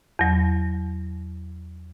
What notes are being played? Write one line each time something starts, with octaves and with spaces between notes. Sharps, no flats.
E2 F#3